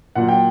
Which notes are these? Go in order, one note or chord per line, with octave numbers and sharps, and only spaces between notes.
A#2 F#3 F#5
G5